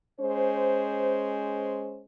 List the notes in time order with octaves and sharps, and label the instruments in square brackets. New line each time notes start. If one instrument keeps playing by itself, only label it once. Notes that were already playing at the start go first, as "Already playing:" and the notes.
[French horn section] G#3 C#4 C5